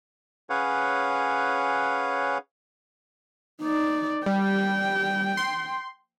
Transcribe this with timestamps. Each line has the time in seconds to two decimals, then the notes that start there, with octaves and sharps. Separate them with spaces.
0.50 C#4 G#4 B4 C#5 F5 F#5
3.62 D#4 D5
4.26 G3 G5
5.37 C6